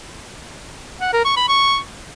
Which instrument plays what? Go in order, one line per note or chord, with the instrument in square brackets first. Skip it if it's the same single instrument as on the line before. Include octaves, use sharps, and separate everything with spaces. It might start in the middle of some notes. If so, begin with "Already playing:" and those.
[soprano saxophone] F#5
A#4
C#6
B5
C#6